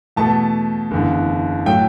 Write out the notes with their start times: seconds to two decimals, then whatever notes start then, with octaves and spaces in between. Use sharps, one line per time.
0.16 E2 B2 A3 A5
0.91 F#1 E2 D3
1.66 A2 F#3 A3 G5